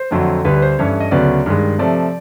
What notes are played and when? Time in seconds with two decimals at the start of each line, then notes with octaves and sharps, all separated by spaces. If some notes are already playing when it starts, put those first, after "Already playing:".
Already playing: C5
0.11 F2 D3 F#3 A3 C4
0.45 D2 D3 G3 B4
0.56 B4
0.62 C5
0.79 G2 E3 A3 C#4 C#5
1.00 D#5
1.11 D2 C#3 F#3 B3 D5
1.46 G2 D#3 G#3
1.78 C3 F3 A3 D5